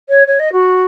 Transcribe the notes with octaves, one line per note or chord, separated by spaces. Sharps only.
C#5
C#5
D#5
F#4